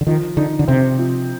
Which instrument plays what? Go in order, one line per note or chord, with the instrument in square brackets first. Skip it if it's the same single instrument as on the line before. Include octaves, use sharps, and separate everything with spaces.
[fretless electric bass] D3
[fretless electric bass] D#3 [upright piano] F3
[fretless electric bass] D3 [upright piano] D#4
[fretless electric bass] D3
[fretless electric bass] C3 [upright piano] C4
[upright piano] F3